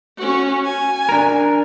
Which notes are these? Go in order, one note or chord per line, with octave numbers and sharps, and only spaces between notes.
C#4 F#4
G#5
D4 A#4